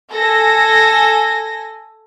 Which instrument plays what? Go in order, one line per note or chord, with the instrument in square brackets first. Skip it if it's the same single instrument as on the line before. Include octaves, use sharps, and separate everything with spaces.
[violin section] A4 G#5 A#6